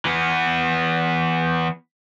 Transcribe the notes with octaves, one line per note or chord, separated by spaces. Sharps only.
E3 B3